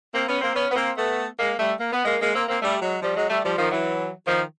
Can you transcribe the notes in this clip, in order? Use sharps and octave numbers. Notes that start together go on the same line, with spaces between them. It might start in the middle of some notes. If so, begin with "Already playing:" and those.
A#3 C4
B3 C#4
A#3 C4
B3 C#4
B3
A#3 C4
A3 B3
G#3 A#3
G3 A3
A#3
B3
G#3 A#3
G#3 A#3
A#3 C4
A#3 C4
G3 A3
F#3 G#3
F3 G3
F#3 G#3
G3 A3
F3 G3
D#3 F3
E3 F#3
D#3 F3